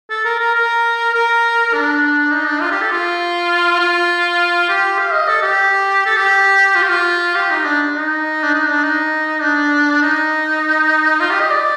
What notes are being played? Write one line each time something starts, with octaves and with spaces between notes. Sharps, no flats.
A4
A#4
A#4
A#4
A#4
D4
D#4
D4
F4
G4
A4
F4
F4
G4
F5
D#5
A4
G4
A4
G4
F4
G4
F4
G4
D#4
D4
D#4
D4
D#4
D4
D#4
D4
D#4
F4
G4
D#5
D5